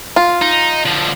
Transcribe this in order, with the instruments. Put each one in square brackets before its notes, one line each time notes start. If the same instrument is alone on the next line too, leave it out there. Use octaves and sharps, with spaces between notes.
[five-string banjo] F4
[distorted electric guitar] D#4
D3 F3